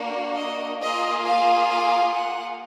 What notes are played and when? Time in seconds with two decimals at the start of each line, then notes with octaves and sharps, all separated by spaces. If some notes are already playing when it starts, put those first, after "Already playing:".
Already playing: A#3 D4 F#4
0.36 D#5
0.80 A#3 F4 G#4 D#5
1.24 F5
1.69 F5
2.13 F#5